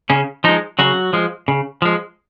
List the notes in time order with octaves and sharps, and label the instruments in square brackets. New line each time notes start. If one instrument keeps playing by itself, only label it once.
[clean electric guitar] C#3 C#4
F3 G#3 D#4
C#3 F#3 F#4
F3 G#3
C#3
F3 G#3